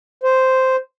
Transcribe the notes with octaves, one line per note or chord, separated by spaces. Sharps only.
C5